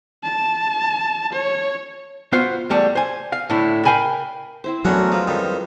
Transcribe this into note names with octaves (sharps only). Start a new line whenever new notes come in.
A5
C#5
B3 F4 F#4 C5 F5
E2 G3 A3
C5 G#5
F5
A2 D3 A3 E4
A#4 F5 G5 G#5 B5
C4 E4 C5
E2 F#3 A3 C#4 D4 A#4 F#5
F3 G#3 B4 A#5
F2 D#3 G3